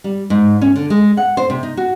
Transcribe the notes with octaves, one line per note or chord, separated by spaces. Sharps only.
G3
G#2
C#4
D3
G#3
F#5
C5
C3
D#4
F#4